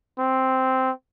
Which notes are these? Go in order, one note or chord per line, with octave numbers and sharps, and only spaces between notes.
C4